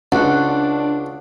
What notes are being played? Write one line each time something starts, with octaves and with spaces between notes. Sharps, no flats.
C#2 D4 F#5